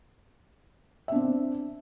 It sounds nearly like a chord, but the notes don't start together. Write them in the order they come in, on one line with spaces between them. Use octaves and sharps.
E5 D4 C4